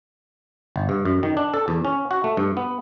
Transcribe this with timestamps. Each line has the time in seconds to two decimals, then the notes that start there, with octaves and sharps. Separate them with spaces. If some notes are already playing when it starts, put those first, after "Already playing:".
0.76 G1
0.89 G2
1.05 F#2
1.23 D#3
1.37 D4
1.54 A4
1.68 E2
1.85 C#4
2.11 F#4
2.24 A3
2.37 G2
2.57 B3